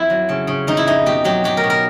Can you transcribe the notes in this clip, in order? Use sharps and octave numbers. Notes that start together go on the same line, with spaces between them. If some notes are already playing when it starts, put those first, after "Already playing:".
Already playing: F2 E4
F#3
C#3
C#3
F2 D#4
E4
F2 D#4
B2 G4
F#3 G4
F#3 G4
A#4
B2
A#4